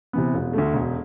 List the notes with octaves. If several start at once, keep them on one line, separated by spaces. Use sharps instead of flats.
C3 E3 B3
E1
D2 D3 A3
E1